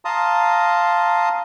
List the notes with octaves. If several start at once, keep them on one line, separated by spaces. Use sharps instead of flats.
F5 A5 A#5 C6 D#6